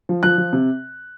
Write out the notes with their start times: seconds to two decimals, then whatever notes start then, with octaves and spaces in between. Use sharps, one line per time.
0.09 F3
0.23 F3 F#6
0.38 F3
0.53 C3